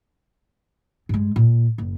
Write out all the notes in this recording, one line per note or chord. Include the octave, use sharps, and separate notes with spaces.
G2 G#3
A#2
F#1